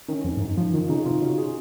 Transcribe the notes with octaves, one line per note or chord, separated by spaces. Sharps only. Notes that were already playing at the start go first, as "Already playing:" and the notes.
D#3 C#4
F2
G#2
F#2 D#4
F3
D#3 F4
C#3 D#4
C3 F4
C#3 F#4
G#4